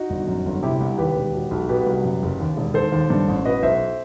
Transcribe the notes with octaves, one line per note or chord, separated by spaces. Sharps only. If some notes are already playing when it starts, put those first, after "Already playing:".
Already playing: D#4 F#4
G1
F#2
G1
C3 E4 G4
C2
D#2 G4 B4
E1
B2
B1
B2 G4 B4
C2
F#2
F#1
D#2
E1
D#3 A4 C5
D#2
G2
A1
B2 B4 D#5
B1 C5 E5